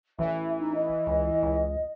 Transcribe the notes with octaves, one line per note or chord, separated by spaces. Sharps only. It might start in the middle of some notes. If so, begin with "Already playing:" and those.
A1 E3 E5
D#4
D#5
C#2
C#2